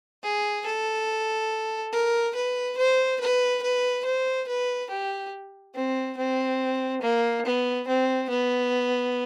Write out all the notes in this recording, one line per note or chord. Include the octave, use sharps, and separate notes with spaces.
G#4
A4
A#4
B4
C5
B4
B4
C5
B4
G4
C4
C4
A#3
B3
C4
B3